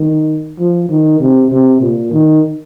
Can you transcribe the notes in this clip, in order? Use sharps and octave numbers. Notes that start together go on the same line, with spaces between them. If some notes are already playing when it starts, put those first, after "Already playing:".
Already playing: D#3
F3
D#3
C3
C3
A#2
D#3